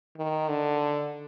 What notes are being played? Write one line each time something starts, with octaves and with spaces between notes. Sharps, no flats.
D#3
D3